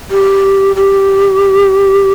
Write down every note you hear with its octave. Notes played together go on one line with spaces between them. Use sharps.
G4
G4